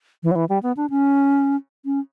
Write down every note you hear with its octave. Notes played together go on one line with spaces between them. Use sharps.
E3
F#3
E3
G3
B3
D4
C#4
C#4